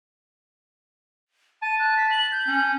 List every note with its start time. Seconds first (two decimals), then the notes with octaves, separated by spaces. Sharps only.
1.62 A5 D#7
1.79 F#6
1.97 B6
2.11 F#7
2.32 G6
2.47 C#4